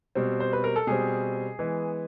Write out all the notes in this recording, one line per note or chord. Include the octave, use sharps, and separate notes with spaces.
B2 G3 C4
C5
B4
A#4
A4
B2 G3 C4 G#4
E3 G#3 B3